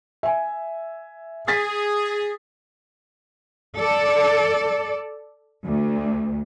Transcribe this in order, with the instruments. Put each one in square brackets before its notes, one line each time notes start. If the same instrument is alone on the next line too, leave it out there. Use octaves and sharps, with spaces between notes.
[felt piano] E5 G#5
[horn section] G#4 [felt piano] A6 B6
[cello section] A4 D5
D2